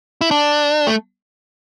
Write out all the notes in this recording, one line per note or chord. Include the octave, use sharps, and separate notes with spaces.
E4
D4
A3